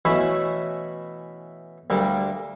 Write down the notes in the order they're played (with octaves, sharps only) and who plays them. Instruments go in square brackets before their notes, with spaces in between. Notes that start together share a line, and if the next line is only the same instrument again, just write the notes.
[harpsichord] B2 E3 A3 C#4 E4 B5
D2 G3 A#3 D4 D6